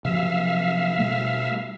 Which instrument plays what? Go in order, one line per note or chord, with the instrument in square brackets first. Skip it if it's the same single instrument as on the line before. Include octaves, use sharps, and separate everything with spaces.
[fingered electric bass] C3 F3 F#3 [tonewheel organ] E5 F5
[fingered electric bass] B2 G3 A3